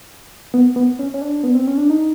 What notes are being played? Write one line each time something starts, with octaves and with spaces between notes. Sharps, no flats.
B3
B3
C#4
C#4
D4
B3
C4
C#4
D4
D#4